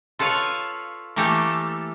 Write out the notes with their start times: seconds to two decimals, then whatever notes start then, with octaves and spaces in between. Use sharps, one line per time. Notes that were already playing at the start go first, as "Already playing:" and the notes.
0.19 F4 A4 B4 C#5 F5
1.16 E3 A3 A#3 G4 A4